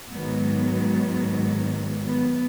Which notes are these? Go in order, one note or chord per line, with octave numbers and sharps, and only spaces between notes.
G#2 D#3 F#3 B3
B3